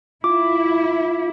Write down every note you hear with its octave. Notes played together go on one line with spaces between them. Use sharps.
E4 F4 D6